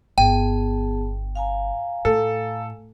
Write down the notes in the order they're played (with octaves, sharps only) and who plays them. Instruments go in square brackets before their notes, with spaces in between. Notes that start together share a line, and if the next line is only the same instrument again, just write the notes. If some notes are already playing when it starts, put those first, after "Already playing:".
[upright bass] G1 [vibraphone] B3 G#4 A5 [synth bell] G5
[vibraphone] F5 G#5 A#5
[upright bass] A2 [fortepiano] A4